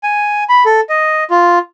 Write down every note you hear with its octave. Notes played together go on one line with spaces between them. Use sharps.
G#5
B5
A4
D#5
F4